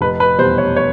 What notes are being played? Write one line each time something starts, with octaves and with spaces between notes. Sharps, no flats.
F1 B4
B4
E2 B2 G3 C5
C#5
C#5